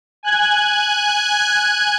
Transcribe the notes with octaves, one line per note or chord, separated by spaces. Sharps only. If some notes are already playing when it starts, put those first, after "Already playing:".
G#5 F#6 G#6